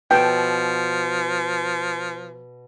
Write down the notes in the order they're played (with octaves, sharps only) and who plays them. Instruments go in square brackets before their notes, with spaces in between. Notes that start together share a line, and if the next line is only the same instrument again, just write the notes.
[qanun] B2 A4 C#5 [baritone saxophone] F3 [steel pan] G5